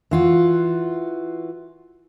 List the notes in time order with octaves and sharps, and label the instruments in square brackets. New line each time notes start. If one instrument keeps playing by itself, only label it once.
[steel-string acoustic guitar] E3 F4 F#4